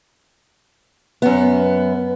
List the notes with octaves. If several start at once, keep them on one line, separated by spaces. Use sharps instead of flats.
F#2 B3